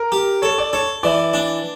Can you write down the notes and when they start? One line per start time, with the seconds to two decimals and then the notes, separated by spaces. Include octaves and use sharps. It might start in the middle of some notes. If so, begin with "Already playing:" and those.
Already playing: A#4
0.12 G4
0.42 A4 C#5
0.58 D5
0.73 A4 C#5
1.03 E3 D5
1.33 D4